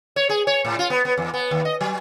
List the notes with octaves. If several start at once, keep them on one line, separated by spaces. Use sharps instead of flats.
C#5
G#4
C#5
A2
F4
B3
B3
E2
B3
D#2
D#5
F#3